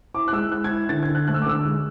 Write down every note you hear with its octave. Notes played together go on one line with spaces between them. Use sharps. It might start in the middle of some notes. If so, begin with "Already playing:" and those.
E4 D6
F#6
G#3 E6
E4 F#6
G#6
E4
D3 A6
G#6
D3
F#6
A3 F#6
E6
D6
D3 E6
G#3